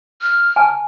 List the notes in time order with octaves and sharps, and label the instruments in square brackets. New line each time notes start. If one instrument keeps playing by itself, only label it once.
[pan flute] F6
[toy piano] G#5 A5